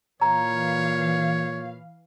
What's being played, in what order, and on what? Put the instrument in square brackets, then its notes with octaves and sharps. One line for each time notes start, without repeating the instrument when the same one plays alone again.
[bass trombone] A#2 [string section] E3 F5 [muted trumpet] C#5 [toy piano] A#5